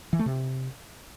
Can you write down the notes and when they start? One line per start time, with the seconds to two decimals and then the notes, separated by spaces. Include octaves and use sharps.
0.13 E3
0.19 A3
0.26 C3